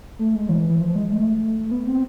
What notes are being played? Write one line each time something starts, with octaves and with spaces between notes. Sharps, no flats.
A3
G#3
E3
E3
F3
G#3
A3
B3
C4